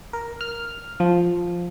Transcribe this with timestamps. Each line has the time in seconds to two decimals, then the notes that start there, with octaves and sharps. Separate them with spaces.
0.13 A#4
0.41 F6
1.00 F3